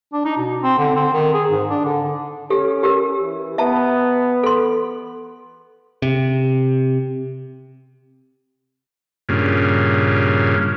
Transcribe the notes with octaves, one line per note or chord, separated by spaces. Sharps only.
D4
D#4
B2
C4
D3
C4
D#3
G#4
G#2
D4
D3
C#4 G4 A4
G4 A#4
E3
B3 E5 A5 A#5
A4 C6
C3
G2 A#2 C#3